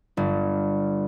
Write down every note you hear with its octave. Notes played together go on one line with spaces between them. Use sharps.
G1